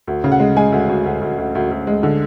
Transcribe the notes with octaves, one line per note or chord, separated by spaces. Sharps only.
D2
C#3
F#5
G#3
G#3 G#5
D2
D2
D2
D2
D2
D2
D2
G#3
D3